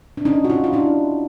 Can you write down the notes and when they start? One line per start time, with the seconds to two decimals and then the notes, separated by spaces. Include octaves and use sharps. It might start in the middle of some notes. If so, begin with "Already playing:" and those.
0.17 D4
0.25 C#4 D#4
0.45 F#4
0.50 D#4 F4
0.64 F4
0.73 D4 E4